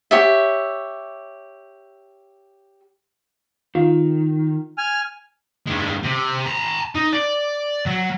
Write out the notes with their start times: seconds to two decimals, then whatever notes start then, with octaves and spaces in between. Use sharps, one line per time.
0.11 G4 C#5 E5
3.75 D#3 F4
4.78 G#5 F6
5.67 G2 G#3
6.03 C3
6.47 A5 A#5
6.95 D#4
7.13 D5
7.86 F#3